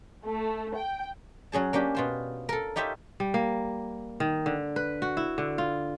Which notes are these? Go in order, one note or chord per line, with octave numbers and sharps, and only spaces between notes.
A3
G5
F#3 C#4 G#4 A5
A#3 C#4 D4 G4
B2 F4 C5
A4 A#4
D#4 F4 G4 C#5 E5
G3
A#3
D#3
D3
B4
F#4
E4
D3
F4